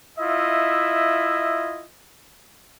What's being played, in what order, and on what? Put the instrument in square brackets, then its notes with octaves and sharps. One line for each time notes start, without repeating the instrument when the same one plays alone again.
[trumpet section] E4 F4 D#5 E5